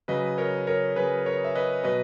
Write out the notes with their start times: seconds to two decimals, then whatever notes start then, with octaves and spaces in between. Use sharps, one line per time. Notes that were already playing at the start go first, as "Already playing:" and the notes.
0.08 C#3 F#3 B4 D#5
0.38 A#4 C#5
0.67 A#4 C#5
0.96 C#3 F#3 G#4 B4
1.26 A#4 C#5
1.44 E5
1.55 B4 D#5
1.84 B2 F#3 B4 D#5